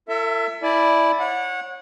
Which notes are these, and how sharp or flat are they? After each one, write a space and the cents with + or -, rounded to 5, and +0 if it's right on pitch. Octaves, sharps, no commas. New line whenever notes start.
F4 -35 A4 +45 E5 +15
E4 +0 D5 +0 G#5 +45
C#5 -30 F#5 -25